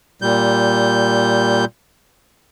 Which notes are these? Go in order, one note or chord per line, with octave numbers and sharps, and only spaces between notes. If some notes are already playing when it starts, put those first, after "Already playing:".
A#2 G3 G6